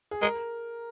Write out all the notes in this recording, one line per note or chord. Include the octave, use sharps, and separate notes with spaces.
G#4
G#3 A#4